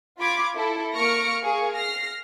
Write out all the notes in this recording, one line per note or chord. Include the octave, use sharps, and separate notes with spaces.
F4 B5 D6 G#6
E4 A4
A#3 C#6 F6 A#6 C#7 D7
G#4 A#4 F5 C#6
F6 A#6 C7